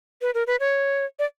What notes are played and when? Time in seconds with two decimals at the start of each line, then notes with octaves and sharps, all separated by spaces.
0.22 B4
0.34 A#4
0.47 B4
0.60 C#5
1.19 D5